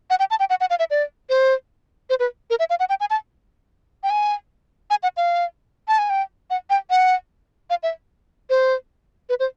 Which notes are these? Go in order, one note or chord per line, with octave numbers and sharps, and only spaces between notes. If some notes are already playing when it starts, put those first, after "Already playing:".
F#5
G5
A5
G5
F#5
F#5
F5
E5
D5
C5
C5
B4
A#4
E5
F5
F#5
G5
G#5
A5
G5
G#5
G#5
F#5
F5
A5
G#5
G5
F#5
G5
F#5
F5
E5
C5
B4
C5